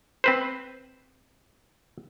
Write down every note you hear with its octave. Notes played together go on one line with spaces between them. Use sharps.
C4 B4 C5